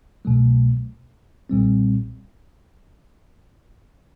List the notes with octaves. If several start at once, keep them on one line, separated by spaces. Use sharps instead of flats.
C2 B2 F#3 A3
B1 A#2 G3 C4